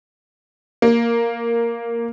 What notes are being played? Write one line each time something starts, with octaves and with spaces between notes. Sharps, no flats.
A#3